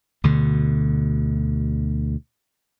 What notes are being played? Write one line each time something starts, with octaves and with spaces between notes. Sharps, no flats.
D2 B2 D3